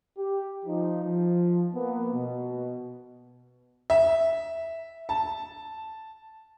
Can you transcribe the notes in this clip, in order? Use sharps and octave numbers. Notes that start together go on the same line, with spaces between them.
G4
F3 D#4
F3
A#3 B3
B2
E5
A5